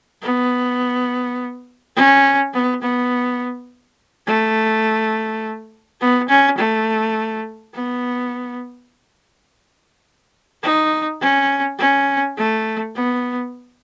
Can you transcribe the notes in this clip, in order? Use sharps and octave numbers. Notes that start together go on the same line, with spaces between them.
B3
C#4
B3
B3
A3
B3
C#4
A3
B3
D#4
C#4
C#4
A3
B3